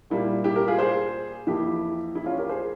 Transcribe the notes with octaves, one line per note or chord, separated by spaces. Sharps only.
A#2 G3 A#3 E4
E4 G4
G4 A#4
F4 G#4
G#4 C5
F2 E3 A#3 E4 G4
E4
C#4 F4
G4 A#4
G#4 C5